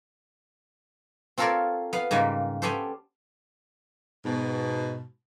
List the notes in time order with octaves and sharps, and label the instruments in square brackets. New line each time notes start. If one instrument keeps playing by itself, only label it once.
[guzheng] C4 F4 A4 A#4 C#5 D5
B3 F5
G#2 C#3 G3 A#3 A#4 B4
B3 C#4 G4 A4 C5
[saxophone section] G#2 B2